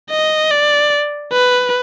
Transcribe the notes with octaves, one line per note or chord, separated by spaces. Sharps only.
D#5
D5
B4